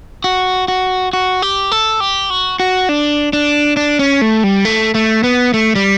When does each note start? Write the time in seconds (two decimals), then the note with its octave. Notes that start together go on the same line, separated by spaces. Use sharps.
0.24 F#4
0.68 F#4
1.13 F#4
1.42 G4
1.71 A4
2.00 G4
2.30 F#4
2.60 F#4
2.89 D4
3.33 D4
3.77 D4
3.99 C#4
4.21 A3
4.44 G3
4.65 A3
4.95 A3
5.24 B3
5.54 A3
5.75 G3